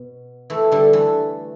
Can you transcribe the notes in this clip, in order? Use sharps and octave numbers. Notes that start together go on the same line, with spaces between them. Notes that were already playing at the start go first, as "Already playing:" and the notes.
Already playing: B2
E3 A3
D3 G3
E3 A3